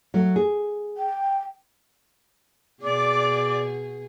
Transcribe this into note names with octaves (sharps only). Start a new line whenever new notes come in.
F#3 A3
G#4
G5
B2 G#4 D5 D6